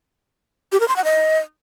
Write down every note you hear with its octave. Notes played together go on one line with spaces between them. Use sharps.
G4
A#4
C6
F#5
D#5